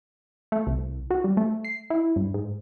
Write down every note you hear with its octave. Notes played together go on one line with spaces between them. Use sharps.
A3
C2
F#4
G3
A3
C7
E4
G2
G#2